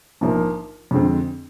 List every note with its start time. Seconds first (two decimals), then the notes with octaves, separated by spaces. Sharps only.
0.21 A#1 G#2 F3 A#3
0.91 F2 D3 G#3 C4